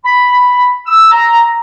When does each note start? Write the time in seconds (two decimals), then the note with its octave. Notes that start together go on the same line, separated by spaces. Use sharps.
0.04 B5
0.86 E6
1.11 A#5